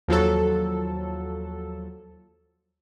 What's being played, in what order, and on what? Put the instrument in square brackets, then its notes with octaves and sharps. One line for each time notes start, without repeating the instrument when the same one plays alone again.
[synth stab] D#2 F3 F#3 A4